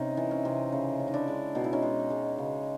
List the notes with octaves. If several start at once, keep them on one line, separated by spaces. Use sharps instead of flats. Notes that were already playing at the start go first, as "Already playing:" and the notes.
Already playing: C3 C#4 D#4
E3
C#4
C3
C#3
C#3
D#4
D4 E4
G#3
B2 D#4
E4
C#4 D#4
G#3
G#3
C#3